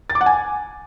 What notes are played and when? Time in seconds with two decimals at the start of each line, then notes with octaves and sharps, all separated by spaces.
0.10 A6
0.15 D6
0.21 F#5
0.26 G#5